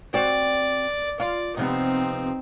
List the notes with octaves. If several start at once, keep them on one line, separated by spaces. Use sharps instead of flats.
C4 F#4 D5
F4 D5
C3 F3 B3 C4 D#4